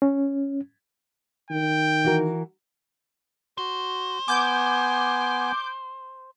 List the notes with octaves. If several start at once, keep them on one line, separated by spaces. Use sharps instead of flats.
C#4
D#3 G5
E3 F#4 A#4
F#4 C5
B3 G#5 D6 G6